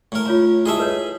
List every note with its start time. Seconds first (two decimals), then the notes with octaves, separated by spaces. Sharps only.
0.12 A2 A#4
0.25 F4 C#5 A#5
0.66 E4 G4 G#4 D#5 E5 A5
0.79 B4 C#5